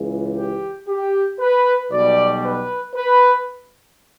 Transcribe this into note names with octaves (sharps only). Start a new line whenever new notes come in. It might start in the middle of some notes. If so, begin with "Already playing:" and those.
Already playing: C#2 C#3 E3
G4
G4
B4
B1 B2 G3 D5
B4
B4